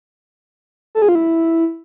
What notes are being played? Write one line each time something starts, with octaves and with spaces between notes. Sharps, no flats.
A4
G#4
F4
E4